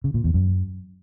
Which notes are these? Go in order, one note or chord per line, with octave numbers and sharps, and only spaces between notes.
C#3
A#2
E2
F#2